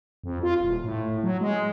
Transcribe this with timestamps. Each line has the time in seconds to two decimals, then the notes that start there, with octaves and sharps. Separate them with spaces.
0.24 F2
0.43 F4
0.60 D#1
0.84 A2
1.23 F#3
1.41 G#3